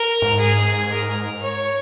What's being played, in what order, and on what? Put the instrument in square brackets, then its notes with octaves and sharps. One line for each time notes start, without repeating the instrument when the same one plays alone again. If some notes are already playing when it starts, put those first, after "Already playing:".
Already playing: [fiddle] A#4
[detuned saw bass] G#2
[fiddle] G#4
A#4
C#5